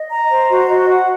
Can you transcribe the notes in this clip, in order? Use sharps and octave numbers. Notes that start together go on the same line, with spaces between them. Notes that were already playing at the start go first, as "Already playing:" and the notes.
Already playing: D#5
A#5
C5
F#4
D#5
F#5